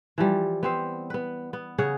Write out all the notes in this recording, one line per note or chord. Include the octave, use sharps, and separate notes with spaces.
E3 F3 G3
B3 C4 C5
B3 B4
B3
C#3 G#4 C#5 F#5